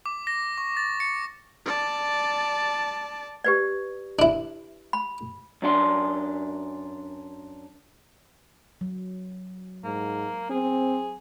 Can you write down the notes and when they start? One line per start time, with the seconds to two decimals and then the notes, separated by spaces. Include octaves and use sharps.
0.06 D6
0.27 A#6
0.58 C#6
0.77 A6
1.00 C#7
1.65 D5 A5
3.44 G4 B4 D5
4.19 D4 E4
4.93 B5
5.62 F#2 D4 E4 C6
8.81 F#3
9.84 G#2 A#3
10.50 C4 G#4